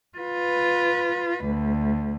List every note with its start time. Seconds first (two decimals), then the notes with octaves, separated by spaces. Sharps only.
0.18 F4 B4
1.45 D2